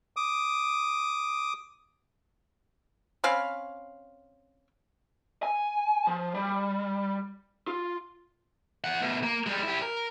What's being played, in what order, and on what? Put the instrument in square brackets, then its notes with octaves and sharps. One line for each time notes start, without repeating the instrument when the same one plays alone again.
[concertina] D6 D#6
[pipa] C4 C#4 F5 B5
[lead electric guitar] G#5
F3
G3
F4
[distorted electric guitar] E3 F#5
B2 A3
A#3
G3 G#3
E4 G4
A#4